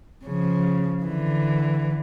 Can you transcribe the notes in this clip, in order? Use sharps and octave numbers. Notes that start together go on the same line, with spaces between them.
C#3 F3
D3 E3